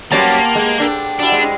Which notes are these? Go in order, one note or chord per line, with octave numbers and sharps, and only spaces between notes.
F#3 G3 A#3 B3 C#4 G4 C5 A5
G#3
D4 A4 G5
F#3 G3 D4 E4
G#3 C4